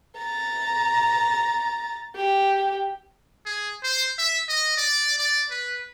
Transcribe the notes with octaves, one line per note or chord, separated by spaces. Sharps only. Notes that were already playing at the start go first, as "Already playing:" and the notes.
A#5 A6
G4
G#4
C5
E5
D#5
D5
D5
B4